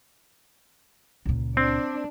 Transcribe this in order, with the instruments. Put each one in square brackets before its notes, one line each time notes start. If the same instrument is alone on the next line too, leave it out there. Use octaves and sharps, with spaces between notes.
[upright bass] C#2 A#2
[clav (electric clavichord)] C4 [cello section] D4